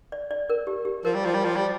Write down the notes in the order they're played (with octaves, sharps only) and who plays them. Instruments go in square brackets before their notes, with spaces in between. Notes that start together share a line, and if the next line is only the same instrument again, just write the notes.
[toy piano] D5
D5
A#4
G4
G4
[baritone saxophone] F3 [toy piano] A#4
[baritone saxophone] G3
F3
G3
F3
G3